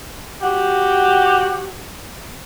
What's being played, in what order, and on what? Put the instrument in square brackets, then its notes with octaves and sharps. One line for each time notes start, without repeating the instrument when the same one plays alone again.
[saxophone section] F#4 G4